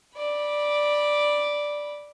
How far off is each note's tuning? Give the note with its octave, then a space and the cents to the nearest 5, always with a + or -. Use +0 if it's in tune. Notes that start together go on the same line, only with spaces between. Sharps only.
D5 +0 B5 -15